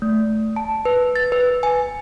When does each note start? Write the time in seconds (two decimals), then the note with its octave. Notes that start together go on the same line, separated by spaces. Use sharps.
0.02 A3
0.56 A5
0.85 B4
1.16 A6
1.32 B4
1.63 G#5